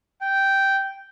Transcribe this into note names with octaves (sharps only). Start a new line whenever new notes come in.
G5